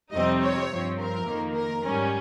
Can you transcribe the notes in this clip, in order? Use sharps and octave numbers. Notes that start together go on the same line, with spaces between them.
F2 C3 G3 C4 D#4 D#5
C#5
G2 F3 C4
A#4
F2 D#3 A#3
A#4
G#2 G3 C#4